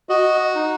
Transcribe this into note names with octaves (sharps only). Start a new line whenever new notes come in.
F#4 D#5
D#4